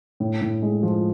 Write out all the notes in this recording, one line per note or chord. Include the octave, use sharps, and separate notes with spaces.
A2
A2
G#3
F3